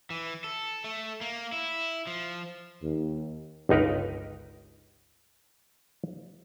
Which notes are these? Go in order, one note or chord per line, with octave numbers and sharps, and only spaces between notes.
E3
A4
A3
A#3
E4
F3
D#2
G1 C#2 D#4 A#4 B4